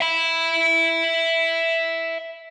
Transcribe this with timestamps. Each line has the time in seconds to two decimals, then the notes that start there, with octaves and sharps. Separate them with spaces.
0.01 E5 B5